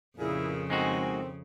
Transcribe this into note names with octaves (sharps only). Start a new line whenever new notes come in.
F2 A#2 C#3 E4 G#4
A2 D#3 G#3 C4 D#4 F#4 G#5